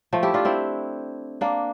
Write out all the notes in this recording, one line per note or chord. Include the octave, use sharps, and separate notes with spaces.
F3 A3
E4 G4
D4 F4
C4 E4
A#3 D4